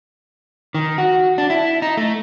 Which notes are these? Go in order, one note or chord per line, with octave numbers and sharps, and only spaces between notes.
D#3
F#4
D4
E4
D#4
A3